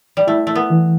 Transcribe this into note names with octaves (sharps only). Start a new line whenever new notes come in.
G3
A3 E4
A3
B3
E3